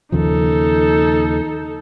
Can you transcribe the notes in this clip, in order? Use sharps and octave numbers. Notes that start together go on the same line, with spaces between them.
D#2 C#3 F3 D#4 A4